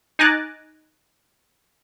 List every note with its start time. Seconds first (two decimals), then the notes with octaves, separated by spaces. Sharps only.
0.19 D#4 G#5 A#5 D6 F#6 A6